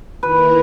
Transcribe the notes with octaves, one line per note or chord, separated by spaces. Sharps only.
D#3 A#3 E4 A#4 B4